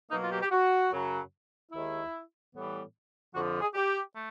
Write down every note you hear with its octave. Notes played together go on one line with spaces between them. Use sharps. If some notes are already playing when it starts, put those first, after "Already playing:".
B2 F#3 A#3 D#4
F4
G4
G4
F#4
F#2 C#3 F#3
D#2 D#3 G#3 E4
A2 E3 G3 B3
F2 D3 F3 F#4
G#4
G4
A3